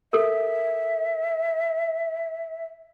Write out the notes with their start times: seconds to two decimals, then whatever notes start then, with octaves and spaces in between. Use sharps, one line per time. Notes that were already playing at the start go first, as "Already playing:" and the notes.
0.13 A4 A#4 E5